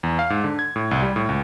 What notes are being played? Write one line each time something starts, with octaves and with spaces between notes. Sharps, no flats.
E2
F5
G#2
D3
G#6
A2
C2
G3
A2
C#2